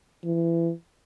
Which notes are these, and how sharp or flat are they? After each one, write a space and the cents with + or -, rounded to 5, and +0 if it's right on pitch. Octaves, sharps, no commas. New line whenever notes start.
E3 +25